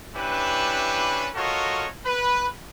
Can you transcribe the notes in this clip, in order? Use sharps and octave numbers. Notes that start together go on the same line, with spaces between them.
C#4 D4 E4 G4 B4
F4 F#4 A4 A#4 C#5 D#5
B4